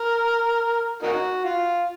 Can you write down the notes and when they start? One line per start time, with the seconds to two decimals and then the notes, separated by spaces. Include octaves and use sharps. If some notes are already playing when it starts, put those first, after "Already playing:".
Already playing: A#4
1.03 A#3 D#4 F#4
1.45 F4